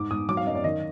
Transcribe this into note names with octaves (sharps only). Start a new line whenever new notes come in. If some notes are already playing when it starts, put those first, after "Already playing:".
Already playing: G#2 D6
G#2 D#6
F#3 D6
F5
F#2 D#5
D5
D#3 D#5